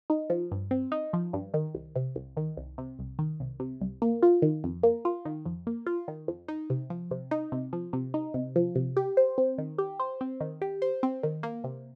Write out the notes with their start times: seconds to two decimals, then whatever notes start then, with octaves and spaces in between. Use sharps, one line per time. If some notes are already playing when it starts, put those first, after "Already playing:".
0.10 D#4
0.30 F3
0.51 G2
0.71 C4
0.92 D#4
1.13 F3
1.33 G2
1.54 D#3
1.75 C2
1.95 C3
2.16 C2
2.37 D#3
2.57 C2
2.78 C3
2.99 C2
3.19 D#3
3.40 C2
3.60 C3
3.81 C2
4.02 A#3
4.23 F4
4.42 D#3
4.64 F2
4.83 A#3
5.05 F4
5.25 D#3
5.45 F2
5.67 A#3
5.86 F4
6.08 D#3
6.28 F2
6.48 D#4
6.70 C3
6.90 F3
7.11 C3
7.31 D#4
7.52 C3
7.73 F3
7.93 C3
8.14 D#4
8.34 C3
8.56 F3
8.75 C3
8.97 G4
9.17 C5
9.38 C4
9.58 D#3
9.78 G4
10.00 C5
10.21 C4
10.41 D#3
10.62 G4
10.82 C5
11.03 C4
11.23 D#3
11.43 A#3
11.64 C3